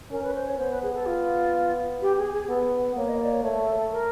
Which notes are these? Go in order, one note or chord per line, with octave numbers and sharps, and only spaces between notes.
C#4 A#4
B4
C5
C#5
B3 C5
B4
G#4
A4
F4
G4
G#4
G#4
B3 A4
A#3 C#5
D#5
D5
C#5
A3 C#5
A4
A4
A#4